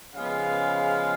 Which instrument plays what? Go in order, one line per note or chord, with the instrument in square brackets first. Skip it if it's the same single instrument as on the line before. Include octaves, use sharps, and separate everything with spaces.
[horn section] C#3 F3 G#3 B3 F5